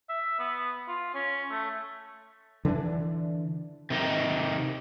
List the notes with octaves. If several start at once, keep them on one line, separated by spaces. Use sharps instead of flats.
E5
B3
F4
C#4
A3
D3 E3 G3 D4
C3 D#3 D#4